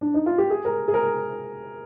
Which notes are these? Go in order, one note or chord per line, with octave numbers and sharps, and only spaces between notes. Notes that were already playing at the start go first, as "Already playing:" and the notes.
D4
D#4
F4
G4
G#4
A#4
G#4
A#4